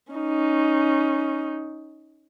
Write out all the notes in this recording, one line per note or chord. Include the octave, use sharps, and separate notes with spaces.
C#4 D#4